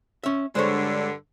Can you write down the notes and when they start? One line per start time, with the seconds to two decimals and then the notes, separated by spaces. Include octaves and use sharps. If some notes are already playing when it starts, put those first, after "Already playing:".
0.24 C#4 E5
0.55 G2 D3 G#3 C5 C#5